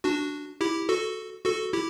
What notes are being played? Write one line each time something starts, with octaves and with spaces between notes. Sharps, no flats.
D4 F#4
E4 G4
F#4 A4
F#4 A4
E4 G4